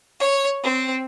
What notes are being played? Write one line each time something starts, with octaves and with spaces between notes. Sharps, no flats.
C#5
C4